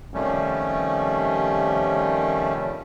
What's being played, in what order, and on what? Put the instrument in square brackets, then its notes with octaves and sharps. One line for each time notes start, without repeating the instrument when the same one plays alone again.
[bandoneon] C3 D#3 F3 G3 A3 C#4